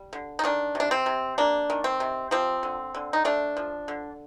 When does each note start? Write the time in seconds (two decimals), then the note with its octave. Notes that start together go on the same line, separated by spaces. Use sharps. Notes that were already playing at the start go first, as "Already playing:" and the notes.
Already playing: G3
0.13 D3
0.39 D#4
0.44 D#3 D4
0.75 C3
0.80 D4
0.91 C4
1.06 C3
1.38 A#3 D4
1.70 D#3
1.84 C4
2.00 C3
2.31 F3 C4
2.63 D3
2.95 D3
3.13 D#4
3.25 A3 D4
3.57 F3
3.88 D3